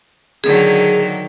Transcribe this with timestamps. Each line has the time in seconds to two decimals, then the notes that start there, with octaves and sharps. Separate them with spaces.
0.44 D3 D#3 F#3 G#4